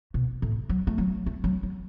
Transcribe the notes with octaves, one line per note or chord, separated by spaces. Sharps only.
B2
A2
F#3
A3
F#3
A3
F#3
F#3